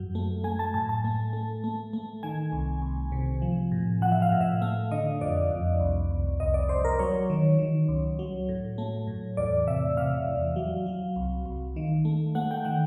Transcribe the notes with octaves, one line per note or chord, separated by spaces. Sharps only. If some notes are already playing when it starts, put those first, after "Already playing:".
Already playing: F#2 F#3
A3
A3 G#5
A5
A2 A5
A5
A3
A3
A3
A3
D#3 G#5
C2
C2
C3
F3
A2
F3 F#5
E5
F5
A2
E5
A3 F5
D3 D#5
F2 D5
F2
C2
C2
C2 D#5
D5
C2 C5
A#4
F#3 C#5
D#3
D#3
C#2
F#3
A2
A3
A2
E2 D5
C3 E5
C3 F5
E2
F#3
F#3
C2
C2
D#3
A3
A3 F#5
G5
D#3 F#5